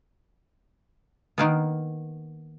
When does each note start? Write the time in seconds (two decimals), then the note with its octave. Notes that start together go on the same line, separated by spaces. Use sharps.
1.38 D#3 A#3 B3